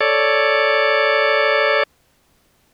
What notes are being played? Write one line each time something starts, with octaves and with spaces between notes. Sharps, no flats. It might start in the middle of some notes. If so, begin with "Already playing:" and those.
A4 C#5 D5